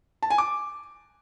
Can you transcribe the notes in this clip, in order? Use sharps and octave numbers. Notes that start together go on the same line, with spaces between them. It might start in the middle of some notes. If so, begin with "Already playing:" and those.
A5
G#5
D6